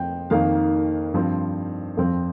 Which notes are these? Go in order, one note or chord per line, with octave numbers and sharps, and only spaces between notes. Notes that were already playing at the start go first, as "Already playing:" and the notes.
Already playing: F2 F3 C4 G5
F2 D#3 A#3 F5
G2 F3 C4
F2 F3 C4